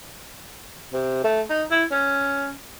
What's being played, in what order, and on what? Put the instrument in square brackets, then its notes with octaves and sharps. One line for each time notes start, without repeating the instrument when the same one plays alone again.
[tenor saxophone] C3
A3
D#4
E4
C#4